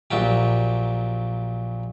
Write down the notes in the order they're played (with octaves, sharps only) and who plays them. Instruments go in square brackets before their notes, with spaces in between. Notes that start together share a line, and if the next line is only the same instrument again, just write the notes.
[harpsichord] A#1 A#2 F#3 G4